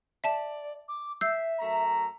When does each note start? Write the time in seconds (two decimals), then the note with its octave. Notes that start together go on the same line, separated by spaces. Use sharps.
0.24 D5 E5 A5 E7
0.88 D6
1.21 E5 E6 G6 C7
1.59 F#2 A3 A#5